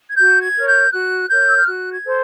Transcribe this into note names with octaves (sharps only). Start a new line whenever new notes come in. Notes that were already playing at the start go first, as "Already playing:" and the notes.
G#6
F#4 G6
G#6
A#4 C#5
G6
F#4 F#6
A#4 C#5 G6
E6
F6
F#4 F#6
G#6
A4 C5